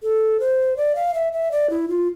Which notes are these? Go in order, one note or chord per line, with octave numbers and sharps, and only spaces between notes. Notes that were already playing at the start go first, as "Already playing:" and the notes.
A4
C5
D5
F5
E5
E5
D5
E4
F4